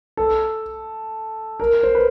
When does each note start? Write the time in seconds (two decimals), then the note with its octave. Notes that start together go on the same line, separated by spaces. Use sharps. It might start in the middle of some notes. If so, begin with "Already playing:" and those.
0.17 A4
1.60 A#4
1.83 C5
1.95 B4